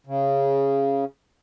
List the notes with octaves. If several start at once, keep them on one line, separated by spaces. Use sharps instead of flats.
C#3